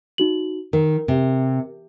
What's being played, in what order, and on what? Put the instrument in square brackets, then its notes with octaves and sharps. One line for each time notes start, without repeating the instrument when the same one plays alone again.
[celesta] D#4 F#4 F#7
[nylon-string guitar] D#3 [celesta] A#4
[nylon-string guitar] C3